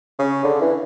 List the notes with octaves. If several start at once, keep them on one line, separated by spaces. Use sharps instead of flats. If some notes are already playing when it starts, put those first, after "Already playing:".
C#3
D3
E3